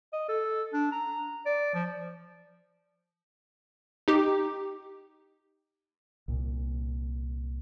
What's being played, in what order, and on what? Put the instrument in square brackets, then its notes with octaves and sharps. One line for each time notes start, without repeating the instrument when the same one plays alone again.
[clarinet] D#5
A4
D4
A#5
D5
F3
[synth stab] D#4 G4
[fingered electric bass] C2 A#2